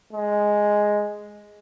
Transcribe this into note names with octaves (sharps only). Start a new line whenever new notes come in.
G#3